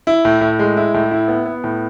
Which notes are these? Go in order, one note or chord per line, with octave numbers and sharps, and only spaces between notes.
E4
A2
A2
G#3
E4
A2
E4
B3
B3
A2